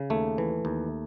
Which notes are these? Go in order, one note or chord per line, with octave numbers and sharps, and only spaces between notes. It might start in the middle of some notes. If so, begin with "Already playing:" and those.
Already playing: C#3
D#2 A3
E3
D#2